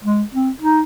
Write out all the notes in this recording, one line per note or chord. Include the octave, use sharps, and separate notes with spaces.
G#3
C4
D#4